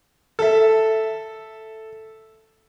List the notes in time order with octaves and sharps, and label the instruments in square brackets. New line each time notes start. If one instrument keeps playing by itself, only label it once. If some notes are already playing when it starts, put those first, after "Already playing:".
[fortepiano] A4 E5